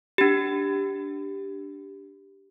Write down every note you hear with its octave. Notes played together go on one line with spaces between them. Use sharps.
D4 G4